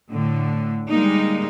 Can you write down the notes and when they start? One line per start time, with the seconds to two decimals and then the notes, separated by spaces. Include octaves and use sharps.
0.11 A2 D3
0.88 G3 G#3 A#3 D#4